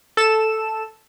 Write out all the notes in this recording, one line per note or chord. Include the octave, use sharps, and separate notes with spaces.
A4 E7